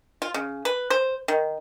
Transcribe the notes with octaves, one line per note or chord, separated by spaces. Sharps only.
F4
C#3
B4
C5
D#3